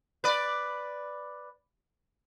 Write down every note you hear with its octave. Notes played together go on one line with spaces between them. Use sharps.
B4 D5